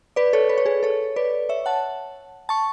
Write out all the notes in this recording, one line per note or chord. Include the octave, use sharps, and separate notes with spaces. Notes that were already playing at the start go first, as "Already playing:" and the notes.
B4 D5
A4 C#5
B4
C#5
G#4 B4
A4 C#5
B4 D5
C#5 E5
F#5 A5
A5 C#6